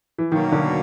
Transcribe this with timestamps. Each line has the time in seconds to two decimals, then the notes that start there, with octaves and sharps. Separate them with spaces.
0.18 E3
0.32 B2 D#3 F#3 A#3
0.52 D3